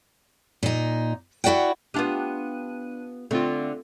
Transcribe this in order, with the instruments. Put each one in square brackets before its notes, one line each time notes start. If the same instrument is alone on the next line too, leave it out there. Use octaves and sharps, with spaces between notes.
[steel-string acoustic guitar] A#2 D#4
E4 F#4 D5 F#5 G5
[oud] B3 F4 G4 [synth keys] D4 F#6 D#7
[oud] D3 [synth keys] A3 C4 F4